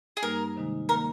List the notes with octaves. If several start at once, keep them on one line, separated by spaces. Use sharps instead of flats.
G#4
G2 G3 A#3 D#4 A#4
C3 D#3 G#3 D#4
D#3 A#3 A#4